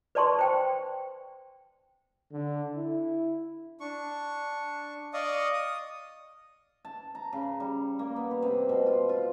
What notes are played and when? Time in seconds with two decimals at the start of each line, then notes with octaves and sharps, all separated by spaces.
0.15 B4 D5 A5 C6 C#6
0.39 C5 G5
2.32 D3
2.76 E4
3.80 D4 C#6
5.13 D5 D#5 F5 C#6 D#6
5.54 D#6
6.85 A5
7.15 A#5
7.33 C#3
7.60 G3
7.99 A#3
8.16 B3
8.31 G4
8.43 C3
8.69 B2
8.86 F4
9.09 F4